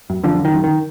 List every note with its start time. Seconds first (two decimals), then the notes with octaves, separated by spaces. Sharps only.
0.10 F#2
0.23 F#2 D3 F3
0.39 F#2
0.45 D#3
0.54 F#2
0.64 D#3